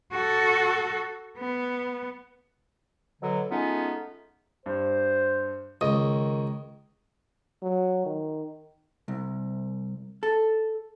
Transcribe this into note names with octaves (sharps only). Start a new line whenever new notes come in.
F#4 A4
B3
B2 D3 F#3
G#3 A3 B3 C#4 D#4 F4
G2 C5
C#2 D#3 D#5 D#6
F#3
D#3
C2
A4